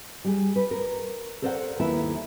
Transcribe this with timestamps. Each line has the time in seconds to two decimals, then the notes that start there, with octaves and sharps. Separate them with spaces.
0.24 G3 G#4
0.56 B4
0.71 A#4
1.42 A4 A#4 C5 D5 D#5 F#5
1.79 D#2 B3 E4 E5